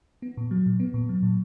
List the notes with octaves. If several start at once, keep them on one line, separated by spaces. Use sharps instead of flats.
B3
A#2
F#3
A#2
B3
A#2
F#3
A#2